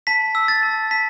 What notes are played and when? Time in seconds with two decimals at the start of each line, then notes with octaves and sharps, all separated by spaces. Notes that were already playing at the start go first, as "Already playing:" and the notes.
0.07 A5 B6
0.35 E6
0.48 A6
0.63 A5
0.91 A5 B6